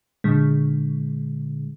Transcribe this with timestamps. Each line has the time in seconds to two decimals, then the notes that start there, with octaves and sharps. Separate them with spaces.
0.24 A#2 D3 G#3